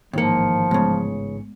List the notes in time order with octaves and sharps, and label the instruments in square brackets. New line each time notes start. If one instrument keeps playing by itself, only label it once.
[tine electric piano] A1 G#2 C#7 [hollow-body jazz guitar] D#2 A#3 [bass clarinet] F3
[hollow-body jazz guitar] C#2 C#3 [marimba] G#3 A3 B3